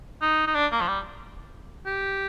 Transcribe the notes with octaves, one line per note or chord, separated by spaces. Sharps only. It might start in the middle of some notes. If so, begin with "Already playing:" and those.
D#4
D#4
D4
A#3
F3
G3
G4